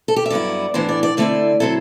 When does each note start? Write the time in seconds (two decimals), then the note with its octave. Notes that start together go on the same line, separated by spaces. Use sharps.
0.08 A4
0.16 G4
0.26 E5
0.30 G2 F#3 B3 E4 D5
0.74 A2 E3 B3 D4 C5
0.89 D5
1.03 D5
1.17 D3 A3 C4 E4 D5
1.60 D3 F#3 C4 E4 A4